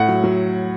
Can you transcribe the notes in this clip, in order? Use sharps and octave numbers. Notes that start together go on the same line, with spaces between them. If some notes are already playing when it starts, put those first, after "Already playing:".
Already playing: A2 F#5
F#3
F#3